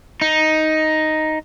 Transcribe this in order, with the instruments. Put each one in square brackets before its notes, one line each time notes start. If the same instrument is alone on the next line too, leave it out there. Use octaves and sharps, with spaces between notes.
[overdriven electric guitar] D#4